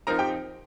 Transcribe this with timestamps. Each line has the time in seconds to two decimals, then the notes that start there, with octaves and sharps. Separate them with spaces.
0.07 F3 C4 D#4 A#4 A#5
0.19 G4 G5